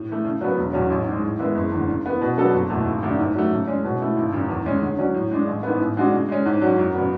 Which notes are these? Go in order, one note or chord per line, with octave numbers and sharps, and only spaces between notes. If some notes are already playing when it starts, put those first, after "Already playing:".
Already playing: A2
E3 A3
C#3
F#3 B3
E1
E2 C#3 F#3 C#4
A1
G#2 G#3
A2
E3 G#3 B3 E4
F#1
E2 D3
C#3
E3 B3
B2
F#3 B3 D4 A4
F#1
E2 B2 A3
G#1
F#2 D3 A3 D4
G#2
F#3 A3
C#3
G#3 C#4
B2
A3 E4
G#1
F#2 C#3
E2
C#3 G#3 C#4
D3
F#3 C#4
A2
G#3 D4
A1
G#2 E3 B3
A1
G#2 G#3 D4 F#4
C#3
G#3 C#4
G#2
F#3 C#4
F#2
C#3 F#3 B3